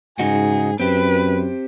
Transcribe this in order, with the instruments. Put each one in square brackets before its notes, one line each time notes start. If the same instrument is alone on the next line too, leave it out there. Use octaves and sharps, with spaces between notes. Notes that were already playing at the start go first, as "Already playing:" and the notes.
[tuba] G#2 [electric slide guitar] C#3 D#4 F#4 [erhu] G#4
[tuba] F#2 [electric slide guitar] C4 G4 [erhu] B4